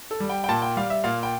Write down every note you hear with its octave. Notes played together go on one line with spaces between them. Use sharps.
A4
G3
G5
G5
A#2 A5
G5
G3 F5
E5
A#2 F5
G5